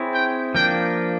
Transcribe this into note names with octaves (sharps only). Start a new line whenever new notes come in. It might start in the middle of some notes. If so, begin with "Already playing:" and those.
Already playing: C4 E4 G#4 C#5
G5
F3 A#3 D4 G5